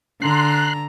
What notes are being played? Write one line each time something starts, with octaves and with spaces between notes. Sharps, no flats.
D3 A#5 C6 F#6